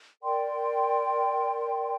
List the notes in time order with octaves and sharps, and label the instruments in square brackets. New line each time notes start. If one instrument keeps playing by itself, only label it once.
[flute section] A#4 D5 G5 C6